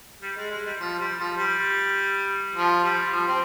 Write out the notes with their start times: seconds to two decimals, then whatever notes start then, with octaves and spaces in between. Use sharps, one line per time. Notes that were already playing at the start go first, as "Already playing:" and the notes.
0.21 G3
0.36 G#3
0.51 G#3
0.66 G3
0.80 F3
0.99 G3
1.19 F3
1.37 G3
2.55 F3
2.83 G3
3.13 F3
3.27 C4